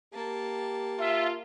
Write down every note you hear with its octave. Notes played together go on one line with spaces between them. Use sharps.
A#3 G4 A5
F4 E5